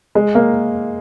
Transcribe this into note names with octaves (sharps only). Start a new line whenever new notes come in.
G#3
A#3